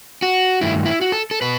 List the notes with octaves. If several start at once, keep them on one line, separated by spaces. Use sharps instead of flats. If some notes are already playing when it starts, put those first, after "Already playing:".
F#4
G2 D#3 A3 E4
E4
F#4
A4
A4
B2 B4